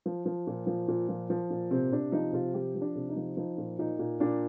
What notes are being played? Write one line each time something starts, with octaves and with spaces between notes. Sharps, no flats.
F3
F3
A#2
F3
A#2
F3
F3
A#2
C3 C4
C3 D4
F3 D#4
C3 F4
F3 G4
F3
D4
C3
D#4
F3
F3 D#4
A#2
A#2 D#4
A#2
A#2 D4